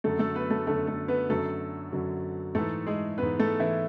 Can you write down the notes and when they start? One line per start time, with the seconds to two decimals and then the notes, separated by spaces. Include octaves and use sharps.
0.04 F#2 D3 F#3 A3 A4
0.19 A3 A4
0.35 B3 B4
0.50 A3 A4
0.66 F#2 D3 F#3 A3 A4
0.87 A3 A4
1.08 B3 B4
1.29 F#2 D3 F#3 A3 A4
1.92 F#2 D3 F#3
2.55 G#2 E3 A3 A4
2.86 G#3 G#4
3.18 G#2 E3 B3 B4
3.40 A3 A4
3.60 E3 E4